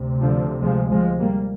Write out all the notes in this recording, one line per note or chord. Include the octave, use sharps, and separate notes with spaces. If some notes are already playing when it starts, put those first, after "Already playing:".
Already playing: D2 C3
D3 F3
F3 G#3
F3 G#3
G3 A#3